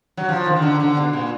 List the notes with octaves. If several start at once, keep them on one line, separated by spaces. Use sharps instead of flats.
F#3
F3
D#3
D#3
D3
D3
B2
A#2